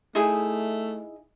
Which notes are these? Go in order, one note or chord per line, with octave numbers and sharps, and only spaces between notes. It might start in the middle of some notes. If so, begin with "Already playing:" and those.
A3 D#4 E4 G#4